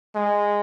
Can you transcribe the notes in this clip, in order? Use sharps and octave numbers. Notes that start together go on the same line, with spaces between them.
G#3